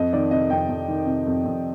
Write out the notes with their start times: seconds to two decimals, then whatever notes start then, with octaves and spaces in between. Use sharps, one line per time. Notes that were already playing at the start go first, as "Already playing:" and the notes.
Already playing: F2 D#5
0.13 D#3 D5
0.31 C3 D#5
0.50 F2 G5
0.69 F2
0.88 D#3
1.07 C3
1.26 F2
1.45 F2